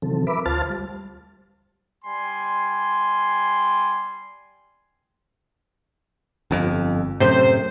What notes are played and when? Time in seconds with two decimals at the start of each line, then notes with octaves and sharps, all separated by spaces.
0.02 C3 D#3 E3 F#3 C4 A4
0.27 A#4 B4 E5 B5 D6
0.46 D2 F4 C5 A5 F6 A6
0.70 G3
2.05 G3 G#5 C6
6.51 G1 F2
7.20 F#2 A2 C3 C5